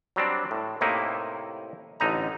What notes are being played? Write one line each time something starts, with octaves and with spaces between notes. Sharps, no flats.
F#3 G3 C4 D4
A2
A2 C3 A#3 D#4 E4
A1 D3 D#4 A#5